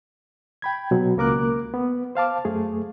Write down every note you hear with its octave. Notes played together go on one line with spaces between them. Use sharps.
G5 B5 G#6
B2 F#3
C#2 A#3 A#4 D6 F#6
B3
C5 F5 A5 D6
F#2 A3 G#4